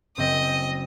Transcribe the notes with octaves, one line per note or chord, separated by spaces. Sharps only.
F#1 C4 D#5 G5